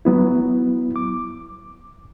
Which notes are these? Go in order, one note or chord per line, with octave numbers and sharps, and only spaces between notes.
F#3 B3 E4
D6